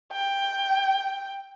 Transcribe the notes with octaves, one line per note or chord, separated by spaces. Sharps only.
G5